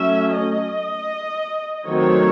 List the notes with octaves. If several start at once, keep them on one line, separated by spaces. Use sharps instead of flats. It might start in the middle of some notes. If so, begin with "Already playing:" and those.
Already playing: F#3 A3 C#4 E5
D#5
D#3 F#3 A3 C4 C#5